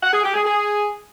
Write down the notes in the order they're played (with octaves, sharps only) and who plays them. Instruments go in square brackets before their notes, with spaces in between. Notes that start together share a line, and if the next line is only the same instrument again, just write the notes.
[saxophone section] F#5
G#4
G4
G#4
G#4